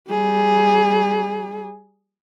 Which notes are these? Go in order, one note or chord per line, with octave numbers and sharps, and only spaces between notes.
G3 G#4